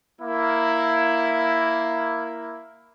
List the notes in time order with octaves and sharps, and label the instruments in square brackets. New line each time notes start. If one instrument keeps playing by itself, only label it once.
[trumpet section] A#3 E4